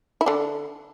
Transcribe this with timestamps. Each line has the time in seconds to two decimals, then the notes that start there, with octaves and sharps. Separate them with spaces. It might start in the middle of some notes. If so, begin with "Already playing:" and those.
0.21 E4
0.26 D3 D4